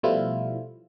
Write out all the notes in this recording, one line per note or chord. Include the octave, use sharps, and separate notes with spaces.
B2 F3 G3 A3 E4 F4